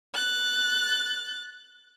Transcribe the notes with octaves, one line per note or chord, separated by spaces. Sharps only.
F#6 A6